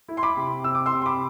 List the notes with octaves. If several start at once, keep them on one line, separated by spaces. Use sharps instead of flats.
E4
C6
B5 D6
C3
C4 E6
D6
C6 E6
C3
C6
B5 D6